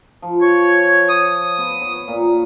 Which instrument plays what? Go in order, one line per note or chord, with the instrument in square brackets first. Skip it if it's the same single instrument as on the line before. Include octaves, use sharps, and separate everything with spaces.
[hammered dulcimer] F3
[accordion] C#5
D#6
[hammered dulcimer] B3
C#5
A#2